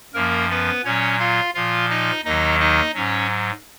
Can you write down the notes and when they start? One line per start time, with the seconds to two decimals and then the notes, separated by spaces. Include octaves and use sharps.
0.14 F#2 F3 A#3 A#4
0.50 B3 B4
0.84 A#2 F#3 C#4 C#5
1.19 F4 F5
1.54 A#2 F3 F4 F5
1.90 D#4 D#5
2.25 D#2 D#3 F#3 D#4 D#5
2.59 D#4 D#5
2.94 G#2 F#3 C#4 C#5